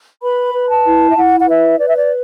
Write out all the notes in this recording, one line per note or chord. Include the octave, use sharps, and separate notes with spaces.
B4 B5
B4
A5
E4
E5
E4 F#5
F#5
B4 E5
B4 D5
E5
D5